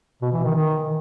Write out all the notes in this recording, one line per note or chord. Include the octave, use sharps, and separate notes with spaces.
B2
E3
D#3
D#3